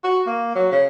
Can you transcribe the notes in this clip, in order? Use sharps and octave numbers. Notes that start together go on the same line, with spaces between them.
F#4
A#3
F#3
C#3